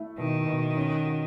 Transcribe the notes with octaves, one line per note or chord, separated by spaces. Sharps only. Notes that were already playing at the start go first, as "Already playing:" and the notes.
Already playing: A3 E4
B2 D#3
B2
C#4
F#4